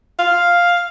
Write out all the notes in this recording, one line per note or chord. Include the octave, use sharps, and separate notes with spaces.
F5